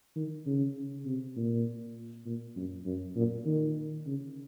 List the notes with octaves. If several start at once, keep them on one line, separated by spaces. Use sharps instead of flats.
D#3
C#3
C3
A#2
A#2
F#2
F#2
A#2
D#3
C#3